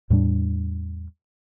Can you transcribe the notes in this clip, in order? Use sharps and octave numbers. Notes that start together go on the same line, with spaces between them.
E2 A2 G3 D4